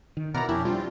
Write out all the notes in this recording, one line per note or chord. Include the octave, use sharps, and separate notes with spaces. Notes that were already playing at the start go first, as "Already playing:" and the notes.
D#3
B2 E4 A#4 D5 F#5 A#5
F2 C#4 D4 E4 G4
G3 C4 D4 F4